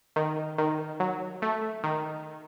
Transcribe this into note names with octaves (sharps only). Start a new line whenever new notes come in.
D#3
D#3
F#3
A3
D#3